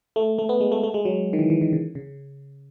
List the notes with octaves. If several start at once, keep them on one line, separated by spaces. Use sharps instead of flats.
A3
A3
B3
G#3
A3
A3
G#3
F#3
D#3
E3
E3
D#3
C#3
C#3